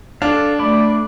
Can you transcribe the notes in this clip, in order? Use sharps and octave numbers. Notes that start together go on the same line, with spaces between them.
D4 A4 F5
A3 D5 B5